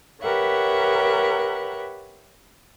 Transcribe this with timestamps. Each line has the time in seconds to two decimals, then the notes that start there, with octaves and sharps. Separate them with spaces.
0.22 G4 A#4 B4 C#5 E5 F#5